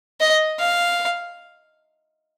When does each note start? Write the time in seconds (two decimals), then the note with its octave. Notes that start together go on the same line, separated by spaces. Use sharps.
0.20 D#5
0.60 F5